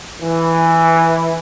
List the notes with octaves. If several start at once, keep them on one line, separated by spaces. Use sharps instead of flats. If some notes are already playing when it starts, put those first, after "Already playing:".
E3